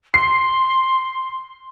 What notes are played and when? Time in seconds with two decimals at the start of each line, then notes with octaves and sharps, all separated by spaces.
0.14 C6 C7